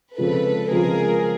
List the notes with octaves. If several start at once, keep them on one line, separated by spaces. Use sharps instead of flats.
C#3 F3 G#3 C4 F4 A4 B4
C#3 F3 G#3 C4 F4 G#4 A#4